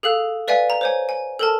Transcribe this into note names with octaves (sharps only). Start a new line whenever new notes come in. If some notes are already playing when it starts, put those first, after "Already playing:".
G#4 A4 F5 F#6
B4 D5 E5 F5 G#5
A#5
C5 C#5 G#5
G#5
A4 A#4 A5